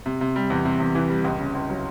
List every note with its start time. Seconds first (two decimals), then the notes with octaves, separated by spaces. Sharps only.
0.06 C3
0.21 C3
0.36 G3
0.50 E2
0.65 C3
0.80 E2
0.95 E3
1.10 G3
1.24 C#2
1.40 C#3
1.55 C#2
1.70 F#3